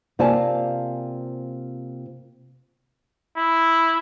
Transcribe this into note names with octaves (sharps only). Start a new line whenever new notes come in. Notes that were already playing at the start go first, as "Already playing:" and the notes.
C3 A#3 F4 D5 G#5 A5
E4